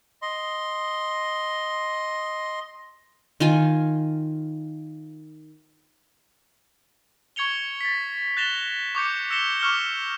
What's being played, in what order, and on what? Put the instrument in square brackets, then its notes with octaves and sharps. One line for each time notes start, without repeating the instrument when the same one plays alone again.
[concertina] D#5 C6
[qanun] D#3 F4 G#5
[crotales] C#6 G#6 C#7 F7 G7
A6 B6
F#6 A6 A#6 E7 F7 G7
C#6 D6 G6 C#7
E6 A#6 C#7 E7 G7
C#6 D6 F6 C#7 E7 G7